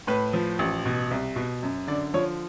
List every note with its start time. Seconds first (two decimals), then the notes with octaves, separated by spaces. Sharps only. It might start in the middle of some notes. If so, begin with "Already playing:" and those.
0.07 A2 B4
0.33 F3
0.59 A1
0.86 B2
1.11 C2
1.36 B2
1.63 F#2
1.87 D3 D5
2.14 F3 C#5